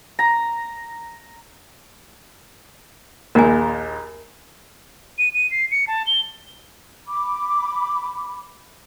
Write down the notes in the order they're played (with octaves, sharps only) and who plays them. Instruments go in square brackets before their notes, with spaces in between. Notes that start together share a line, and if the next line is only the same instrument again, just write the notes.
[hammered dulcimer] A#5
[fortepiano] A#1 D#2 [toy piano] A#4 G#5
[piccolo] D#7
D#7
C7
C#7
A5
G7
[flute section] B5 D6